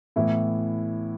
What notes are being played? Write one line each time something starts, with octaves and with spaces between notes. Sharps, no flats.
A2 E3 B3 E4